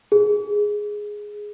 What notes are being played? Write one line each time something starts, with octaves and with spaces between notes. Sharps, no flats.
G#4